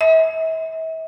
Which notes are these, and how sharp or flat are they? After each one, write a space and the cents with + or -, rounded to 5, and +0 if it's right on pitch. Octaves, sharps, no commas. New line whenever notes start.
E5 -40